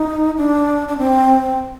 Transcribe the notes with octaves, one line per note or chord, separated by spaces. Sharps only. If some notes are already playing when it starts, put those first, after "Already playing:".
Already playing: D#4
D4
D4
C4